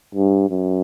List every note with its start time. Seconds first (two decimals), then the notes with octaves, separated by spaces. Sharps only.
0.15 G2
0.50 F#2